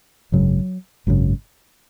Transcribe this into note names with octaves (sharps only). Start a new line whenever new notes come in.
G#1 F#2 C#3 F#3
G#1 F#2 C#3